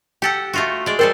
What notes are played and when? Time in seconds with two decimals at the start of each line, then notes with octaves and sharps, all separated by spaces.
0.22 G4 A4 F#5 G5
0.53 A3 F4 F#4
0.86 G#3 D5
0.99 G3 A4 A#4 C5 G5